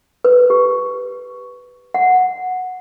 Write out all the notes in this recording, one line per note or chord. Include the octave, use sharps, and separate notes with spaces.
B4
G4
F#5